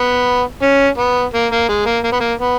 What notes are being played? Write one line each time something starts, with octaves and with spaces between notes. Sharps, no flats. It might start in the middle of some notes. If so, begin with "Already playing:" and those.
Already playing: B3
C#4
B3
A#3
A#3
G#3
A#3
A#3
B3
A#3
B3